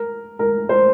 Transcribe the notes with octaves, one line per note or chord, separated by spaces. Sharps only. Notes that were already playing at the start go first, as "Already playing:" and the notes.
Already playing: A#4
A#4
C5